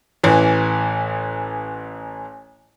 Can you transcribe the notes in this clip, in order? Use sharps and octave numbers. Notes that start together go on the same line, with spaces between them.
A1 E3